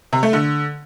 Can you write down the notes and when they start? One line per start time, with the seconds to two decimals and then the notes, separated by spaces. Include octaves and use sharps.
0.13 C3
0.23 A3
0.33 D3